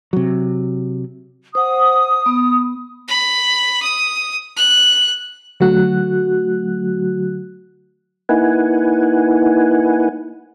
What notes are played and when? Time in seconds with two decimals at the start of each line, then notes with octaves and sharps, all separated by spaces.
0.13 C3 F#3
1.55 C5 F#5 D#6
2.26 B3
3.08 B5
3.82 D#6
4.56 F#6
5.60 D3 F#3 A3 F#4 F#6
8.29 A#3 D#4 E4 B4 F#5 G#5